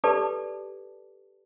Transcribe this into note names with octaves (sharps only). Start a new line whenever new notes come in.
G4 A4 B4 D5 A5 D6